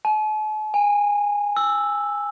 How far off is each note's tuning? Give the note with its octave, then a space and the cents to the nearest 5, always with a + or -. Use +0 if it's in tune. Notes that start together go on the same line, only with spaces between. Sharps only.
A5 -45
G#5 -20
E6 +0